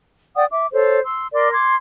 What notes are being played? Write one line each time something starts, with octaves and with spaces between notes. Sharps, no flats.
D5 F#5 G5 D#6
E5 D6
A4 C5 C#5
C6 E6
A#4 D5 C6 D6
C6 D6 G#6